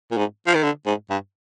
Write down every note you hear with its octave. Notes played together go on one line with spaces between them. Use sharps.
A#2
G#2
F3
D#3
D3
G#2
G2